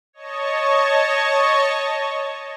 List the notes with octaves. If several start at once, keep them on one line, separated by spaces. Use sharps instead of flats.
C#5 D#5 A5 C#6